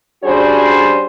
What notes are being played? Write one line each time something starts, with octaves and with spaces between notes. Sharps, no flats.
G3 C#4 D4 F#4 G#4 C5